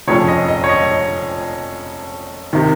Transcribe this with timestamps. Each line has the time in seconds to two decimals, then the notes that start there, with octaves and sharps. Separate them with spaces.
0.08 F1 F2 C#3 C#5
0.28 D#5
0.48 D#5
0.64 C#5
0.69 D#5
2.53 C3 D#3